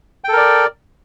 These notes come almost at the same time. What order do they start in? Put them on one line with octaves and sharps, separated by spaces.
G5 A4 A#4 D5